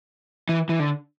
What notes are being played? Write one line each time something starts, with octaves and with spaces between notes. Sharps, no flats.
E3
E3
D3